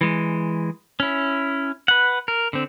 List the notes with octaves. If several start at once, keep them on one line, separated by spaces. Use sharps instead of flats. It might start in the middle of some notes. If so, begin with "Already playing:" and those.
E3 G#3
C#4 E4
B4 F#5
A#4
D3 C4